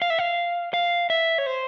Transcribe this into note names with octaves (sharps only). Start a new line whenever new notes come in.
F5
E5
F5
F5
E5
C#5
C5